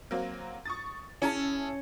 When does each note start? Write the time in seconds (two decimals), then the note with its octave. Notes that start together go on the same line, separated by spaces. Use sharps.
0.11 F#3 A#3 C4
0.66 C#6 D#6 A6
1.22 C#4 E4 G#4 A5